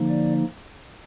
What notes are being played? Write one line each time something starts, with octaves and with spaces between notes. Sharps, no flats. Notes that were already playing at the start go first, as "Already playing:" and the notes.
Already playing: D3 F3 A#3 D#4
D5